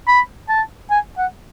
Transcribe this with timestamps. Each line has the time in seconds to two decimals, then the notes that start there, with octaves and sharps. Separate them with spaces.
0.08 B5
0.49 A5
0.91 G#5
1.18 F#5